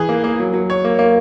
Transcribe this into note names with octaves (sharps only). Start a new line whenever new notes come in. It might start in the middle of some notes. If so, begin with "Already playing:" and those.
Already playing: E3 G#4
A#3
A#3
F#3
F#3
C#5
A#3
A#3